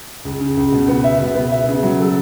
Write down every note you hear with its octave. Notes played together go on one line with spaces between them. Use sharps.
C#2
C#3
C#2
B2
B3
E5
B2
B3
E5
C#3
F#3
A4